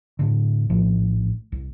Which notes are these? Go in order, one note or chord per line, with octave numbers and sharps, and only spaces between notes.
A2 D3
A#1 A2 F3
C2